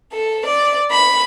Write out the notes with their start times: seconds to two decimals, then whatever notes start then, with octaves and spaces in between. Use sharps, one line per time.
0.11 A4
0.46 D5
0.91 B5